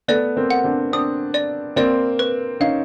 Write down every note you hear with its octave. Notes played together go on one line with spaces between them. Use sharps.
A3 B3 D5
A#3 C4
F#5
C4 D4
C4 D4 D#6
D5
A#3 C4 D5
B4
C#4 D#4 F5